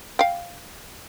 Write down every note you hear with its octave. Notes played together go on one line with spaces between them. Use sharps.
F5 G5